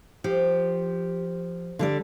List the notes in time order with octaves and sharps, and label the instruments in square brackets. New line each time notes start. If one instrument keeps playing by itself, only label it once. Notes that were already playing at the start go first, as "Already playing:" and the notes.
[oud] F3 [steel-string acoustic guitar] G4
[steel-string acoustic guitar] D3 G3 D5